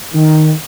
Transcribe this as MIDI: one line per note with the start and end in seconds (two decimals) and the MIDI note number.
0.14 0.52 51